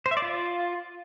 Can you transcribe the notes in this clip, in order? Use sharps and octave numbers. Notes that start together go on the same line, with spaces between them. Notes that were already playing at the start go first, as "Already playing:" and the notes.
C5
E5
D5
F4